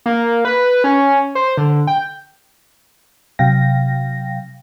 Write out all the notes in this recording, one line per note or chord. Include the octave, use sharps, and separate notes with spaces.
A#3
B4
C#4
C5
D3
G5
C3 F#3 F5 G5 A#6